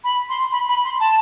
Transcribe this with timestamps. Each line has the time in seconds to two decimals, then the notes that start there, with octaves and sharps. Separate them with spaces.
0.04 B5
0.29 C6
0.52 B5
0.69 B5
0.85 C6
1.00 A5